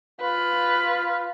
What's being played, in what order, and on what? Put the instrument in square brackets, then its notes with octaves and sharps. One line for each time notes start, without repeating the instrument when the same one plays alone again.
[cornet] F4 [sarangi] B4